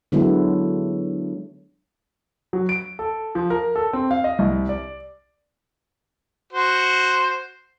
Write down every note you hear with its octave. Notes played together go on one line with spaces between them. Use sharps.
D3 F#3 G#3 B3 E4
F#3
D7
A4
F3
A#4
A4
C4
F5
D#5
C2
D5
F#4 C5